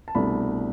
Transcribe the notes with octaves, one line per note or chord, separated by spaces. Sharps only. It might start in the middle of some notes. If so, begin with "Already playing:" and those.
A5
C2 B2 A3 D4 B5